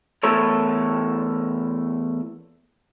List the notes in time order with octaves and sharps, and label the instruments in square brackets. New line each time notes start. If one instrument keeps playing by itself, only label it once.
[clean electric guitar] E2 E3 A3 A4 A#4 C#5